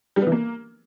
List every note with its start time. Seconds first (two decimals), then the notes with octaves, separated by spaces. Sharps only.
0.16 G3
0.22 B3
0.27 E3
0.32 A#3